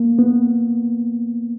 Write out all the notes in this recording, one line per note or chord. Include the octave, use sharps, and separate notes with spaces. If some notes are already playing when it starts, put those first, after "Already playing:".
Already playing: A#3
B3